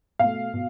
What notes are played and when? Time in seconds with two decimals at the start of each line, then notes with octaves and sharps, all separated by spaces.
0.19 B2 A3 F5
0.54 B2